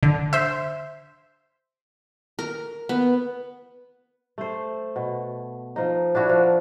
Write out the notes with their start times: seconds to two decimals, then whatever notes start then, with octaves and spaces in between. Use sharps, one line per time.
0.03 D3
0.33 C5 E5
2.39 A#4
2.89 B3
4.38 A3 C5
4.96 B2
5.76 F3 D#4
6.15 D4 E4 F#4 C#5
6.29 F3